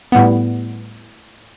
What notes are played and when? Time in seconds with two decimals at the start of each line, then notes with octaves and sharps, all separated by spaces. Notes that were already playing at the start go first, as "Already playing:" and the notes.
0.12 A2 G3 B3